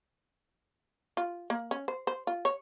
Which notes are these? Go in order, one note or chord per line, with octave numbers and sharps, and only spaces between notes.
F4
A#3
C#4
C5
C5
F4
C#5